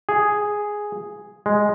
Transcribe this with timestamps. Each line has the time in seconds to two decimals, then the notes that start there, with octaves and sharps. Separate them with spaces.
0.09 G#4
1.46 G#3